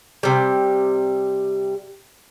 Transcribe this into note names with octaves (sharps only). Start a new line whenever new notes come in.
C3 G3